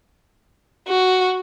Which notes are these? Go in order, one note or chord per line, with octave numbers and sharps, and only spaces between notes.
F#4